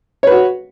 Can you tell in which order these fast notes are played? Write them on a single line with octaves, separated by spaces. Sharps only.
C#5 B4 F#4